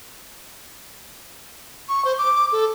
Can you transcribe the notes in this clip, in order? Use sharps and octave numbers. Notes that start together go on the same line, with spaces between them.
C#6
C5
D6
A4